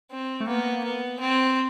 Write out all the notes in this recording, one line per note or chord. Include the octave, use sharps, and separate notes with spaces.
C4
A3
A#3 B3
B3
C4